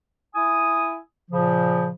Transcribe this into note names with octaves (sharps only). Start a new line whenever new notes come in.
E4 G#5 D#6
A#2 C#3 F3